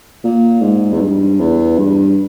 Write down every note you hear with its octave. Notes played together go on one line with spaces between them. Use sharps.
A#2
G#2
E2
G2
E2
G2